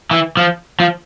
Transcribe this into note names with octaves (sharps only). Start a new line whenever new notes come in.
E3
F3
F3